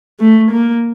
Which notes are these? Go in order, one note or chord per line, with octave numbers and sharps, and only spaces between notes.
A3
A#3